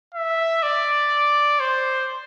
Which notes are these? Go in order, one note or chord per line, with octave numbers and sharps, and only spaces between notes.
E5
D5
C5